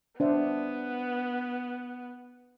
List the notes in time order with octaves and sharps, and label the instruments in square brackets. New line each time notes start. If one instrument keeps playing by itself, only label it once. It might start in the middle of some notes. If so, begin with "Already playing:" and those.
[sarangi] B3 [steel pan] D4 C5 E5